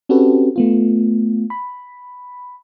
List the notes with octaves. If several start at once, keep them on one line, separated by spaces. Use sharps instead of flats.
C4 C#4 F#4 G4 A4 B4
A3 B3 F4
B5